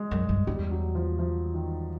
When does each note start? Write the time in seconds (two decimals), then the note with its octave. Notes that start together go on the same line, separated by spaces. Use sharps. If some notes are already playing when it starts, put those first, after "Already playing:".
Already playing: G#3
0.11 F#2
0.29 G2
0.47 E2 G3
0.71 F#3
0.95 F3
1.19 F3
1.54 D#3